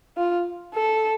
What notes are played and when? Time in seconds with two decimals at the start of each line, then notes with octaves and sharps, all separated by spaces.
0.17 F4
0.75 A4